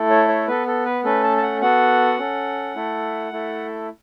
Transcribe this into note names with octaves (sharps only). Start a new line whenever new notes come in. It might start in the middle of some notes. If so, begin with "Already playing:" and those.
Already playing: A3 E4 A4
C#5
C#5
B3 A4 B4
A4
B4
A3 C#4 A4 B4
A5
A5
F#5
B3 F#4 A4 F#5
C#4 A4
A3 E4 A4
A3 E4 A4